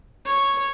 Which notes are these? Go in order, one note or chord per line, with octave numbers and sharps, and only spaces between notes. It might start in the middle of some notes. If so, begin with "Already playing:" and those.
C#5